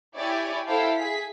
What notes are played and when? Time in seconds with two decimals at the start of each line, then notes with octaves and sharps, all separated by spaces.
0.15 E4 G4 C#5 D5 G#5
0.67 E4 A4 C5 F5 G5 A5
0.96 G#4 B6